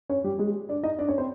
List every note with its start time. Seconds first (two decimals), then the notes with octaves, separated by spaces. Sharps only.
0.09 C#4 C#5
0.24 G3 G4
0.39 G#3 G#4
0.69 D4 D5
0.83 D#4 D#5
0.99 D4 D5
1.08 C#4 C#5
1.18 C4 C5